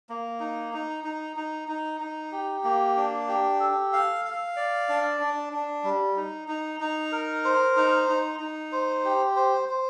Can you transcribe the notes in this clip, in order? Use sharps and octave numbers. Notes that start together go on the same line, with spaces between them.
A#3
D#4
D#4
D#4
D#4
D#4
D#4
G4
A#3
D4
G4
A4
F5
F5
D5
D4
D4
D4
G3
D#4
D#4
D#4
A#4
C5
D#4
D#4
D#4
C5
G4
C5
C5